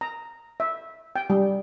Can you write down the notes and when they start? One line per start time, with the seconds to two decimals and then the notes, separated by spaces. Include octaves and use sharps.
0.01 A#5
0.60 E5
1.16 G5
1.30 G3